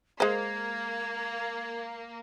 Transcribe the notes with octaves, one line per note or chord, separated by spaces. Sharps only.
G#3 A#3 C5 G#6